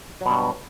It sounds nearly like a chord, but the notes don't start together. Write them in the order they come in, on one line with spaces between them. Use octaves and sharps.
F#3 B2 G2